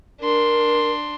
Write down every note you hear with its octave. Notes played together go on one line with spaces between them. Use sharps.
D4 A#4 C6